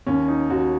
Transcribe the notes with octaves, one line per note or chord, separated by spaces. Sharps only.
D#2 C#4
D#4
D#2 F#4